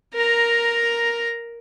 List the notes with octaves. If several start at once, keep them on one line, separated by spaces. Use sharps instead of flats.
A#4 A#5